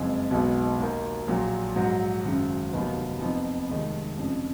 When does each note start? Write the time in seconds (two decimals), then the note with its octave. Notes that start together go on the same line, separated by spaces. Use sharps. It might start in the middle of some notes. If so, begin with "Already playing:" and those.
Already playing: F#1 F2 C#3 G#3 C#4
0.31 B1 B2 G#3 B3 D#4
0.78 D#2 D#3 A#3
1.27 A#1 A#2 F#3
1.76 A#1 G#2 F#3
2.24 G#1 F#2 C#3
2.72 F1 D#2 D#3 F#3 B3
3.20 F2 F3 B3 D#4
3.69 F1 D#2 D#3 G#3
4.18 F2 C#3 F3